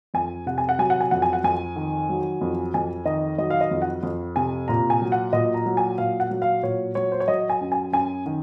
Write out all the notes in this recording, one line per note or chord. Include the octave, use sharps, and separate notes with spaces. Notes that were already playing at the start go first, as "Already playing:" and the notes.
F2 G#5
C3 F#5
G#5
F#5
F#3 G#5
F#5
G#5
F2 F#5
G#5
F#5
F2 G#5
D#3
F#3
F2
F2 G#5
D#3 D#5
F#3 D#5
F5
D#5
F2
F#5
F2
C3 G#5
A#2 A#5
G#5
F#3
F#5
A#2 D#5
A#5
F#3
G#5
A#2 F5
F#5
F#3
F5
A#2 C#5
F#3 C#5
C5
C#5
F#3 D#5
G#5
F#2
G#5
F#2 G#5
D#3